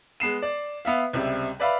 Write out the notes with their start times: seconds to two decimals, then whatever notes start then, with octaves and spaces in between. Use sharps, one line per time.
0.20 G#3 B3 C7 E7
0.42 D5
0.85 B3 E5 F5
1.13 C#2 C3 G3 E5
1.60 B4 D5 E5 F5 B5